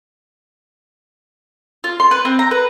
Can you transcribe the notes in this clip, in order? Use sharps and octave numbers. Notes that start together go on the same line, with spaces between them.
F4
C6
B4
C4
A#5
B4